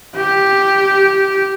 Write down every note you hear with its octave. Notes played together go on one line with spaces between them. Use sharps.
G4